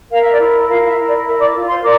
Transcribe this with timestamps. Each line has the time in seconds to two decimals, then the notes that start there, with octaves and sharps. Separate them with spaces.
0.10 A#4 F5
0.21 E5
0.32 D5
0.39 E4 E5
0.67 F4 A#4 F5
0.78 F5
0.87 E5
0.97 E4
1.06 D5
1.25 A#4 E5
1.39 D5 D6
1.54 F4
1.68 C5 C6
1.82 A#4 D5 D6